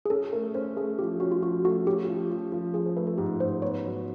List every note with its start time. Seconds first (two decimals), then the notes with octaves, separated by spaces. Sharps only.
0.05 G#4
0.10 C#4 A4
0.33 A3 A#4
0.55 C#4 C5
0.77 A3 G#4
0.99 F3 G4
1.20 C#4 F#4
1.32 F4
1.42 F3 F#4
1.64 A3 F#4
1.87 C#4 G4
2.08 F3
2.30 F3
2.52 F3
2.74 F3 G#4
2.86 C5
2.96 A3 B4
3.07 A4
3.18 G#2 G4
3.40 G#2 C5
3.62 B3 C#5
3.84 F#3